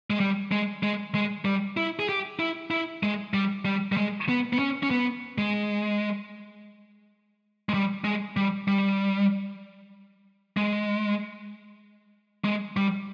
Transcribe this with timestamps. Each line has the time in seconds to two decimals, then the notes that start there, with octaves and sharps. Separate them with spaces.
0.10 G#3
0.20 G3
0.52 G#3
0.83 G#3
1.15 G#3
1.45 G3
1.77 E4
1.99 G#4
2.09 G4
2.39 E4
2.71 E4
3.03 G#3
3.34 G3
3.65 G3
3.92 G3
3.97 G#3
4.29 B3
4.53 B3
4.59 C#4
4.83 C#4
4.91 B3
5.38 G#3
7.69 G#3
7.74 G3
8.04 G#3
8.37 G3
8.68 G3
10.57 G#3
12.44 G#3
12.77 G3